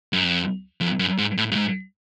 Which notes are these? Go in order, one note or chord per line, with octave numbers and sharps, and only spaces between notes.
F#2
F2
F2
F#2
G#2
A2
G2
G#2